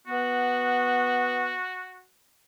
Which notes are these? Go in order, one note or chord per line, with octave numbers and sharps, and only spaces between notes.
B3 F#4